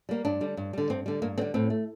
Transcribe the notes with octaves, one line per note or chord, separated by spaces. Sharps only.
G3 A#3
G2 D4
D3 G3
G2
D3 G3
G2 C4
D3 G3
G2 A#3
D3 G3 C4
A2 C4
A3